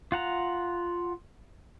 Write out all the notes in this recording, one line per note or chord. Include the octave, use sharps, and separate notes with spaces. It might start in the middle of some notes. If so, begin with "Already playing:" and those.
F4 F#5 A#5